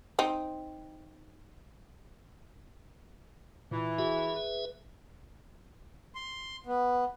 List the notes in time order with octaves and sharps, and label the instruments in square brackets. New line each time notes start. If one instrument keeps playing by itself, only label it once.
[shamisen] C4 D#4
[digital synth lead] A#2 [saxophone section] E3
[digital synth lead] F#4 [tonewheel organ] G#4 E5
[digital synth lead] B4
[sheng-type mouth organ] C6
B3